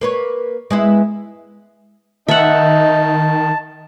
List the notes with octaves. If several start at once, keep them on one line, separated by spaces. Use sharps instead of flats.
A#3 B4 C#5
G#3 B3 E4
D#3 D#4 E5 F#5 A5